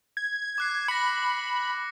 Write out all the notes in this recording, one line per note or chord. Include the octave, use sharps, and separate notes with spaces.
G#6
D6 F#6 C7
B5 A#6 C#7